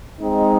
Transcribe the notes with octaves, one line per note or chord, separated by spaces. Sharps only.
G#3 C4 D#4